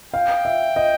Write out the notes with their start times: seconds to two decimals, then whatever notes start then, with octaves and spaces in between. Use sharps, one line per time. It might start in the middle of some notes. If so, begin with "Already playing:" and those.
0.13 F5 G5
0.45 E5
0.76 D#5